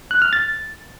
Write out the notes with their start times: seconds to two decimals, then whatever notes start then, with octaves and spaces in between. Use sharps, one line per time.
0.11 F#6
0.22 F6
0.33 A6